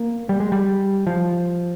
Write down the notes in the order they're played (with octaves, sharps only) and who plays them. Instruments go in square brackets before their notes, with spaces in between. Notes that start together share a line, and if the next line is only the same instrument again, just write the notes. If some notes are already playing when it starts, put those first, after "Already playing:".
Already playing: [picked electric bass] A#3
G3
G#3
G3
F3